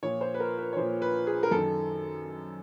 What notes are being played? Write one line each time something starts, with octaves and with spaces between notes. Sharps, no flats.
A#2 F3 C#5
C5
B4
A#4
B4
C#5
A#2 F3 C5
B4
G#4
A#4
F#2 D#3 A4